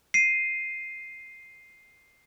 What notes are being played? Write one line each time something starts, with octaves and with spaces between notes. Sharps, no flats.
C7 D#7